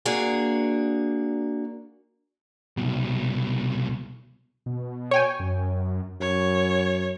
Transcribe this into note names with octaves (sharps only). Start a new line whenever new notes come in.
A#3 D4 F#4 G#4
C2 B2
B2
C#5 G5 G#5
F#2
F#2 C#5